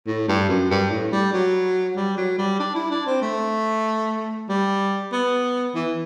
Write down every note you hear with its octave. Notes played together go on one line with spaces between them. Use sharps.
A2
G2
F#2
G2
A2
G3
F#3
G3
F#3
G3
D4
E4
D4
C4
A3
G3
B3
E3